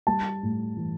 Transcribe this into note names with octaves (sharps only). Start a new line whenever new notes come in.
G3 A5
A2
E3